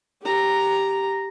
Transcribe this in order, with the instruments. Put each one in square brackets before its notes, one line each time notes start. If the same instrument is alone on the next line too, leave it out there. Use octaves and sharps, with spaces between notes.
[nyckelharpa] G4 A#5